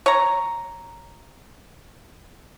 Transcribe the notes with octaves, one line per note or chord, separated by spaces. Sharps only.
C#5 A#5